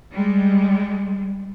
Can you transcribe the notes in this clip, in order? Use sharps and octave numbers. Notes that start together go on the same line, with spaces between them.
G3 G#3